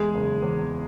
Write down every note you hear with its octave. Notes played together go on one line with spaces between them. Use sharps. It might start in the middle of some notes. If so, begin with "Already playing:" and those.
Already playing: E2 G#3 G#4
F#1
E2